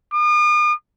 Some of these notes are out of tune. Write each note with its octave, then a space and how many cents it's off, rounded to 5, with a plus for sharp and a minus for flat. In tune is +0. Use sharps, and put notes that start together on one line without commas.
D#6 -45